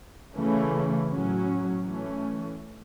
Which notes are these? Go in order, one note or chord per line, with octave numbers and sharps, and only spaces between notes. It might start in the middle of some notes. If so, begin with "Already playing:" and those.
C#3 E3 A3 C#4
A2 F#3 C#4
E3 A3 C#4